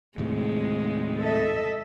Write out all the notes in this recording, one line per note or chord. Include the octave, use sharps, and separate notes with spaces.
D#2 A2 C3 G#3
A4 D#5 E5